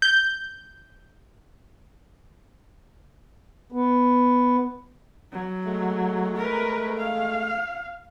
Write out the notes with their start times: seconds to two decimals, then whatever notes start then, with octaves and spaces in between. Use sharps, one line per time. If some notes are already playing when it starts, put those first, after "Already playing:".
0.02 G6
3.72 B3
5.32 F#3
5.64 G#3 A3
6.37 A#4 B4
6.98 F5